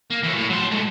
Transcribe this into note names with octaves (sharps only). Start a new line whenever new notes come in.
A#3
E3 F#3
A2
F#3 C6
G#3 A3